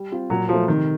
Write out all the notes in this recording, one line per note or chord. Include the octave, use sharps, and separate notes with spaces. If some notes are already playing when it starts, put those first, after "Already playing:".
Already playing: G3
C4 F4
A#2 F#3
F3 F#3 A3
C3 D#3